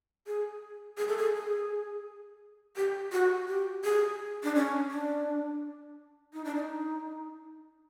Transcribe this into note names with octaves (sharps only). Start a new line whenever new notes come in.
G#4
G#4
A4
G#4
G#4
G4
F#4
G4
G#4
D4
C#4
D4
D#4
D4
D#4